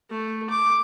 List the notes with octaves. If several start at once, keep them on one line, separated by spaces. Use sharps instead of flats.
A3
D6